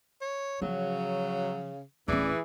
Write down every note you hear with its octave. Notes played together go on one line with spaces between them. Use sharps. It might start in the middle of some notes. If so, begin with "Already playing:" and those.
C#5
C#3 F3 F#3
D1 E3 C#4 G#4 D5